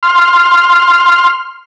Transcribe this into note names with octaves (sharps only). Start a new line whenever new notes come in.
C6 F6